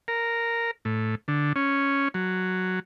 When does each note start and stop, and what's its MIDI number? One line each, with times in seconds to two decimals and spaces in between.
0.08 0.71 70
0.85 1.15 45
1.28 1.53 50
1.56 2.08 61
2.14 2.80 54